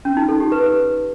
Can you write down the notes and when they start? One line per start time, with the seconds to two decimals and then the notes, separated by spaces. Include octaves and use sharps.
0.05 C#4
0.17 D#4
0.28 A4
0.40 G4
0.52 B4